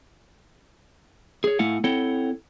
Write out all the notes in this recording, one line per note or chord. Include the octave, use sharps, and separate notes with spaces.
G#4 C#5
A2 A3 E4 F5 F#5 G#5
C4 E4 A4 C#5 F#5 G5